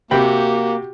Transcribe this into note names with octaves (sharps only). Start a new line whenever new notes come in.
C3 A#3 F#4 G4 G5 B5